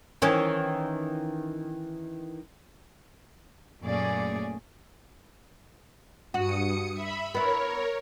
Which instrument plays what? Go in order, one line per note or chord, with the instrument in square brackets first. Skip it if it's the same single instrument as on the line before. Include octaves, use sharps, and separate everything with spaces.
[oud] D#3 E3 C#4
[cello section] F#2 A#2 A3 C#4 G#4 D5
[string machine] G2 D#6 C#7 [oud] F#4
[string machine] E5 B5
[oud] B3 E4 [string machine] A#4 C#5